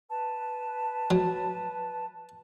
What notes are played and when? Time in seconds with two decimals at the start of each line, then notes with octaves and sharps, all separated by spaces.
0.09 B4 A5
1.11 F#3